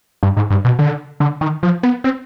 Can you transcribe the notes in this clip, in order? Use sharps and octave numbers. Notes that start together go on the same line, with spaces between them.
G2
G#2
G2
B2
D3
D3
D#3
F3
B3
C4